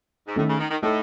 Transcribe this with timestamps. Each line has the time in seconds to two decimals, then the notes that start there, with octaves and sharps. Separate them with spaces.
0.27 G#2
0.36 A2 D#3 A3 C#4
0.49 C#3
0.59 D#3
0.71 D#3
0.83 A2 A3 D#4 A4